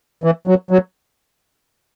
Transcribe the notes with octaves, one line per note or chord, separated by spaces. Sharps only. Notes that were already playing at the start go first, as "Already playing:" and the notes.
E3
F#3
F#3